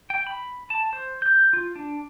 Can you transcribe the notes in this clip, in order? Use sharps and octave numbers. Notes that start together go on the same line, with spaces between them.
G5
B5
A5
C5
G6
F4
D4